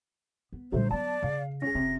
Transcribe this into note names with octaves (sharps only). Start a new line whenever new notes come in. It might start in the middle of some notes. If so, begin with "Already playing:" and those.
B3
A#2 D3 F#3 G3 A3 C5
F#3 B3 D5 A5
C#3 F5
C#4 G#4 A#6
F1 C3 F4